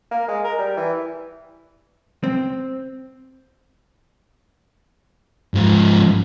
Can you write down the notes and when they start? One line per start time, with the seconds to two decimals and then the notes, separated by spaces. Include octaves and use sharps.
0.11 A#3
0.28 G#3
0.44 A#4
0.58 G3
0.77 E3
2.24 C4
5.54 G#2 F3